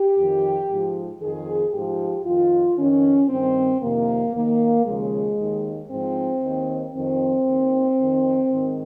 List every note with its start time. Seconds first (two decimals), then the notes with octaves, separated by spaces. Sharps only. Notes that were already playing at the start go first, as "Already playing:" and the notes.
Already playing: G4
0.17 F2 D#3
0.68 G#2 F3
1.21 F2 D#3 G#4
1.73 G#2 F3 G4
2.25 F2 D#3 F4
2.77 F2 D#3 C#4
3.29 G2 D#3 C4
3.81 F2 C3 D#3 A#3
4.33 D#2 D#3 A#3
4.85 D#2 C#3 F3 G#3
5.38 D#2 D#3
5.90 G#2 F3 C4
6.42 D#2 D#3
6.94 F2 D#3 C4
7.46 D#2 D#3
7.98 F2 D#3
8.50 G#2 D#3